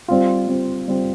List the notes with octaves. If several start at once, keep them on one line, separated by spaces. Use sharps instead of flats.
G3 C4 F4
G3 C4 F4
G3 C4 F4